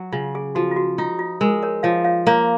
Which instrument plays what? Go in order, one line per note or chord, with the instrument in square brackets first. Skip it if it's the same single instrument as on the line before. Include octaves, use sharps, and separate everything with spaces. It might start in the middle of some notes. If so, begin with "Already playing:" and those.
Already playing: [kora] F#3
[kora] C#3 [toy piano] F4
[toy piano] G#4
[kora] F3 [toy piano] F#4
[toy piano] F4
F#4
[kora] D#4 [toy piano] F4
[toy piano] F4
[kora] G#3 [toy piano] A#4
[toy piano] A#4 C#5
[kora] F3 [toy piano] C#5 F5
[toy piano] C#5 F5
[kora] A#3 [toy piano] C#5 F5